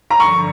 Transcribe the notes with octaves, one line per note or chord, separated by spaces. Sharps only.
A#5
G2 D3 F3 C#6